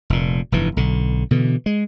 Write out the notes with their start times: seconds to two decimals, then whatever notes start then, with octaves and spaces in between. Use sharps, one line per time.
0.10 F1 A#2
0.52 F1 G2 E3
0.77 B1 D3
1.31 B2 D3 E3
1.66 G#3